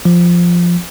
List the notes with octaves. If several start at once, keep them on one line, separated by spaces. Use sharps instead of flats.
F3